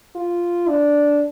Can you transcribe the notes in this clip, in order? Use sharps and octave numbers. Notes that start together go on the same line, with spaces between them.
F4
D4